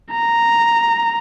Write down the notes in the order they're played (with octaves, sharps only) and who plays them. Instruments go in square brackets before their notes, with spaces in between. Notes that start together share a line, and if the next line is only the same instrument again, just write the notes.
[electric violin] A#5